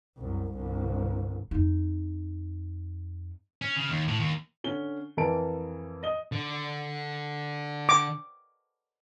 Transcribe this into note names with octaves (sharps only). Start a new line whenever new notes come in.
C2 F#2
G1 C2
F2 D#4
C#4
C#3
D#2
A2
D#2
D3 C#4 G7
F2 E3 A#4 A5 D7
D#5 G7
D3
D6